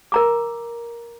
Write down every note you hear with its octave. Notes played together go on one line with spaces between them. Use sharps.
A#4 A#5 D6